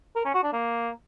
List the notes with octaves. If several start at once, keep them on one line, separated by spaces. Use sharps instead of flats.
A#4
C#4
F#4
D4
A#3